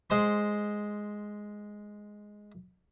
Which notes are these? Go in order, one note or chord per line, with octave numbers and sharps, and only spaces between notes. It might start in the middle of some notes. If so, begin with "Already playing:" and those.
G#3 C5 C6